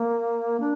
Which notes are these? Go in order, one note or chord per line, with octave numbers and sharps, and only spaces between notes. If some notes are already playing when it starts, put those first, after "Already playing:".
Already playing: A#3
D4